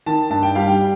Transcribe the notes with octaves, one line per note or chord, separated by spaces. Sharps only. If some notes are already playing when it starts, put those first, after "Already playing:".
D#3 A5
G2 A5
G5
G3 F5
G5